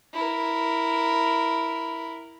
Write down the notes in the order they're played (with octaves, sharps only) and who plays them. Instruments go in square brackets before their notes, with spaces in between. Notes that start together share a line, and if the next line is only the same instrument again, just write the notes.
[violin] E4 A#4